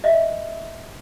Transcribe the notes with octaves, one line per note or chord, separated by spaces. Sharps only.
D#5 E5